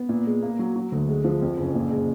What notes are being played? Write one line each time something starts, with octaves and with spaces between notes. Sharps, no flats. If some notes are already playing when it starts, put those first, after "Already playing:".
Already playing: B3
A#2
G#3
A#3
F#3
F#3
D2
G#3
F3
F2
F#1
A#2
G#3